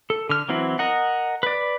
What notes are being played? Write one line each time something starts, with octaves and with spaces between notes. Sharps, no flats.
A4
D3 F6
E3 F#3 C4 E4
A#4 D#5 F#5
B4 D5